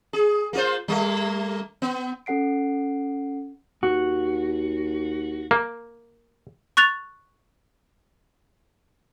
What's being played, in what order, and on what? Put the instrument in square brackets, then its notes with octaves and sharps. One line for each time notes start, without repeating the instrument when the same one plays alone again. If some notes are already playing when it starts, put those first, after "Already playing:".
[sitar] G#4
A#3 F4 C5
G3 A3 A#3
B3
[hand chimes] C#4 A4 F#5 C7 D7
[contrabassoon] D#2 [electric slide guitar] F#4
[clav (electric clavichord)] A#3
[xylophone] C#6 F#6 A6 F7